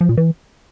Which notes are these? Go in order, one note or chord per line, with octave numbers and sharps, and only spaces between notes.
F3
A#2
E3